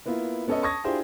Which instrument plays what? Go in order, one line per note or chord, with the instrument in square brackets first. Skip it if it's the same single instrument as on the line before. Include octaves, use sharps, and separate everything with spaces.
[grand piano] A#3 B3 E4 F4
B3 C#4 A4 C#5 D#5
A5 C#6 D#6 G#6 A#6
D4 E4 F4 G4 G#4 C5